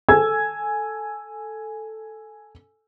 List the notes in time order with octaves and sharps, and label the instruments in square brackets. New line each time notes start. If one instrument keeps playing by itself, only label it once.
[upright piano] A4 G#5 E6 G#6